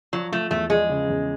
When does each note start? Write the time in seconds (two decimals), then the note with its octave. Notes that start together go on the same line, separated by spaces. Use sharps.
0.13 F3 F#3
0.32 F3 A3
0.51 E2 A3
0.70 F3 G#3
0.89 C#3
1.09 E2